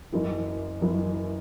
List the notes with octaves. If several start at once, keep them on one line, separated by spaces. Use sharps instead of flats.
F#1 F#2 E3
F#1 F#2 E3